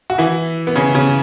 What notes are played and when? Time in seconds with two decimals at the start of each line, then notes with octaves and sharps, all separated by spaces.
0.10 F#4
0.18 E3 E4
0.67 B3
0.75 C#3 C#4
0.94 C#3 C#4